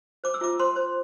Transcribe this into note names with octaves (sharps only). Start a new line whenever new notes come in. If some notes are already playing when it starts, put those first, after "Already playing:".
C5 D6
E6
F4 D6
C5 C6
C5